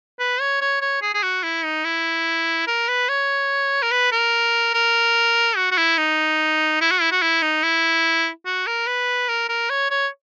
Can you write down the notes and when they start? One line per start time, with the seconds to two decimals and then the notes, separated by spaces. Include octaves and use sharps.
0.20 B4
0.40 C#5
0.61 C#5
0.81 C#5
1.02 G#4
1.14 G#4
1.23 F#4
1.43 E4
1.64 D#4
1.84 E4
2.67 A#4
2.88 B4
3.09 C#5
3.82 A#4
3.91 B4
4.12 A#4
4.74 A#4
5.57 F#4
5.71 F#4
5.78 E4
5.98 D#4
6.81 E4
6.91 F#4
7.01 E4
7.12 F#4
7.22 E4
7.42 D#4
7.63 E4
8.45 F#4
8.67 A#4
8.87 B4
9.28 A#4
9.49 A#4
9.70 C#5
9.90 C#5